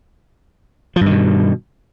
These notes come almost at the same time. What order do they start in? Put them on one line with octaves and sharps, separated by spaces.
F3 G2 D#3 B2